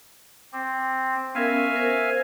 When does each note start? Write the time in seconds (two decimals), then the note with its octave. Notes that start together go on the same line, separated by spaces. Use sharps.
0.53 C4 D6
1.35 B3 C#4 A#4 E5 F5 G#5
1.76 A#4 C5